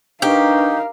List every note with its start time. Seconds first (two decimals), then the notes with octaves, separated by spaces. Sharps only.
0.22 D4 D#4 G4 A#4 B4 F5 C#6